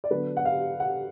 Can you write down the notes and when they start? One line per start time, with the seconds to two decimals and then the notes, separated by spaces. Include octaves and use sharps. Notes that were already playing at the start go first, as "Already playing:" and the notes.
0.04 D5
0.11 D3 F#3 B3 D4 B4
0.37 F#5
0.45 F5
0.80 F#5